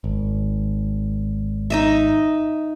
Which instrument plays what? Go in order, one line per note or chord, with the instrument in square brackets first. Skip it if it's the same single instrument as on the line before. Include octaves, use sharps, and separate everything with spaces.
[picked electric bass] G#1
[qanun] D#4 D#5 E5